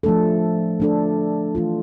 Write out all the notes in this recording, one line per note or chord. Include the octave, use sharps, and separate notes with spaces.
F3 A3 D4 A4
A3 D4 A4
E3 A3 D4 F4